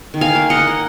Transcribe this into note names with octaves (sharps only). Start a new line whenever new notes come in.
D#3
F5 G#5
A#3
D#5 F#5
A#3
F#5